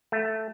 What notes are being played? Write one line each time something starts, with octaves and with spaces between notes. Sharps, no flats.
A3